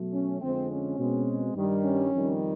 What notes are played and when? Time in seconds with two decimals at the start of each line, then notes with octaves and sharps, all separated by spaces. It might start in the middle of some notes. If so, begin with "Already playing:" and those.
Already playing: B2 F#3 A3
0.13 C#4
0.42 F2 D3 F3 G#3 C4
0.71 C#4
0.99 B2 G#3 C4
1.55 G2 D#3 G3
1.84 C#4
2.12 F2 C3 D#3 G3